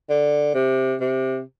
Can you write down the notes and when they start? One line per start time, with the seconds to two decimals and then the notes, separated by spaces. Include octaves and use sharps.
0.10 D3
0.55 C3
1.00 C3